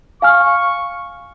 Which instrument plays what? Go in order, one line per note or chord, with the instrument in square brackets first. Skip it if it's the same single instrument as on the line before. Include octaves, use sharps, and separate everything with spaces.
[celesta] F5 G#5 F6 [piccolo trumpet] C#6